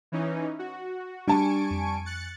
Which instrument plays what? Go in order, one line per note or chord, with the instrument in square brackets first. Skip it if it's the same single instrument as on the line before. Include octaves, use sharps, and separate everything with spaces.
[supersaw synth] E3 C#4 D#4
F#4
[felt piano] G3 A5 [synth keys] D4 [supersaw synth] G#5 C#6 D7
[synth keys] F2
[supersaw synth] F#6 A6 C#7